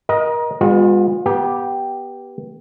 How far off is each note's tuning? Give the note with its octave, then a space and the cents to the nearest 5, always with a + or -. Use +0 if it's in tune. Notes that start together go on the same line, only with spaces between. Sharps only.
A#4 +35 D#5 +0
G#3 -40 B3 +0 F4 +35
B3 -15 G4 +0 A#5 +45